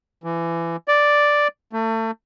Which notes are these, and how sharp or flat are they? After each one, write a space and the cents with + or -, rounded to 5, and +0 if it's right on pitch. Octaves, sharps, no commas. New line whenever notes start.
E3 +25
D5 +0
A3 +30